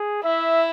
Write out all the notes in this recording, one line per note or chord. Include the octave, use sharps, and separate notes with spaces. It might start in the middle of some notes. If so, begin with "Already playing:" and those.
Already playing: G#4
E4 E5